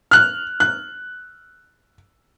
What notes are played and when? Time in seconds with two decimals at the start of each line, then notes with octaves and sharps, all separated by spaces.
0.11 F6 F#6
0.60 F#6